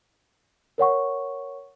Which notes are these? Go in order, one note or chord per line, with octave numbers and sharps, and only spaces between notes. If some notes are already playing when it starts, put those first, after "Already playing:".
A#4 C#5 F#5 C#6